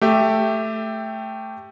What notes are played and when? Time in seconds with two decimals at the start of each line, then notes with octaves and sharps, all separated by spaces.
0.01 A3 G4 E5